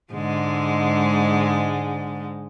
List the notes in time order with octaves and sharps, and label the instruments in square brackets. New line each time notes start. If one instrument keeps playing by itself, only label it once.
[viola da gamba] G#2 D3 G#3